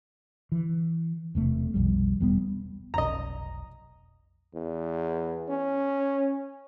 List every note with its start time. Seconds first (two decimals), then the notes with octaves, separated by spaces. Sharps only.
0.52 E3
1.35 E1 C3 A3
1.74 B1 F2 G3
2.20 E1 G3 B3
2.94 F1 B1 D#5 A#5
4.55 E2
5.49 C#4